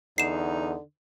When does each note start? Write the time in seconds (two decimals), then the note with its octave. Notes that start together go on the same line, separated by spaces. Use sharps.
0.18 E2 D3 D#4 C7 E7